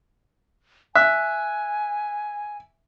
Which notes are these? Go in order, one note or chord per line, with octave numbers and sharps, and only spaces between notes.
E5 G#5 F#6